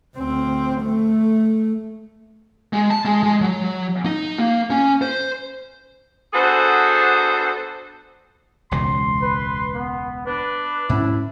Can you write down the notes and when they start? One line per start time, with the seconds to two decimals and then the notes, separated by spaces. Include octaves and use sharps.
0.16 D2 C4
0.82 A3
2.73 G#3
2.90 A5
3.05 G#3
3.23 G#3
3.41 F#3
4.05 D#4
4.38 A#3
4.70 C#4
5.02 C5
6.33 B3 D4 F#4 G#4 A4 C5
8.71 E1 C#2 B2 C6
9.22 B4
9.75 B3
10.27 D4 B4
10.89 G#2 C#4 E4